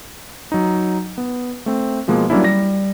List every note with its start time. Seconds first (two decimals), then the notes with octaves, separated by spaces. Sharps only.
0.52 F#3 D#4
1.18 B3
1.66 A3 C4
2.08 B2 F3 G#3 A#3 B3
2.30 F#3 G3 A#3 C#4 D4 E4
2.44 G3 A#6